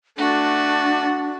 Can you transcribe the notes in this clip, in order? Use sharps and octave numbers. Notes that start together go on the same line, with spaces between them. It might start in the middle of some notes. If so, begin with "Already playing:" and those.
A3 D4 F#4